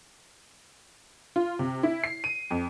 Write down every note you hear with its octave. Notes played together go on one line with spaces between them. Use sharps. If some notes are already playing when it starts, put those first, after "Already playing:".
F4
C3
E4
C7
D#7
F2